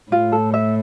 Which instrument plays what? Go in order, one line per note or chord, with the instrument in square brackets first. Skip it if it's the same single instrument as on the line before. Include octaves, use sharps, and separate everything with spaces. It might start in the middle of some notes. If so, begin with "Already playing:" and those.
[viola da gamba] A2 [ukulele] F4
[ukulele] A4
E5